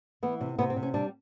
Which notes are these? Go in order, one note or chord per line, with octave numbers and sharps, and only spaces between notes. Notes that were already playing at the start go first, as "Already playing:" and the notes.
E3 B3
C3
C3 B3
C4
C3
C#4
G3 D4